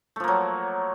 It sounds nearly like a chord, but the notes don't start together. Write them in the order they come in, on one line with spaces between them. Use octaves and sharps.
A3 F3 A#3 F#3